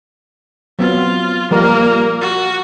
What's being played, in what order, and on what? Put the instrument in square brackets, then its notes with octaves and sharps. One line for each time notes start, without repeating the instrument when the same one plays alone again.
[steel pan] F#3 B3 C4 [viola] F4
[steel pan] F3 G3 A#4 [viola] A#3
[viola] F#4